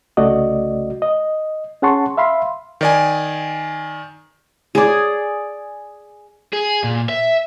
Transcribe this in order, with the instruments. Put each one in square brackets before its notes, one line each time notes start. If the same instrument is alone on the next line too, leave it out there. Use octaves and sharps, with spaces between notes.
[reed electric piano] C2 C#3 A3 F#4 D5 D#5
D#5
C#4 G#4 F#5 A5 C6 C#6
E5 F5 B5 C6
[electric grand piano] D#3 D5 G#5
[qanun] G#4 D5
[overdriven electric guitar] G#4
A#2
E5